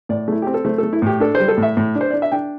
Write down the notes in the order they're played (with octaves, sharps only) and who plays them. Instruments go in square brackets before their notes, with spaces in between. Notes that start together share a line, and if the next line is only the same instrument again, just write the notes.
[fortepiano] A2 D5
A3 E4
C4 G4
A4
A3 C5
A3 A4
E4
A2 G4
D4 A4
C5
G3
A4
A2 E5
A2
D4
C5
D4 D5
E5
D4 G5